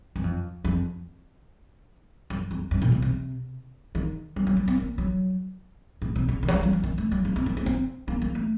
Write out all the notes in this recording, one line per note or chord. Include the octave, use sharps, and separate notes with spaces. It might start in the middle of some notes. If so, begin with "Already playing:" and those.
F#2
F2
F2
F#2
F2
F#2
A#2
C3
C3
D#3
F#3
F#3
A#3
C4
A#3
F#3
A2
C3
C#3
D#3
F#3
F3
F#3
F3
D#3
A3
F#3
A3
C4
A#3
A3
C4
A#3
A#3
A3